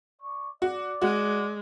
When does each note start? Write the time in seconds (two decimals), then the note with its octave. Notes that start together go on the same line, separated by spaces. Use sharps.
0.21 D5 C#6
0.62 F#4 D5
1.02 G#3 F#4